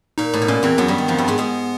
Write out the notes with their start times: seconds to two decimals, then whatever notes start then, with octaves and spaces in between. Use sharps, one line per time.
0.18 A#2 D#4
0.33 A2
0.42 B2
0.48 A#2 C#4
0.63 E2 E3 C4
0.78 F#2 F#3 B3
0.88 G2 G3
0.98 D#3
1.08 F2 F3
1.18 G2 G3
1.28 G#2 G#3
1.38 G#2 G#3